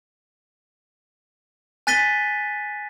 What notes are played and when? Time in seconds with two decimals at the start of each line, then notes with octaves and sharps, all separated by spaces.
1.87 G#5 F#6 A6 B6 D#7 G7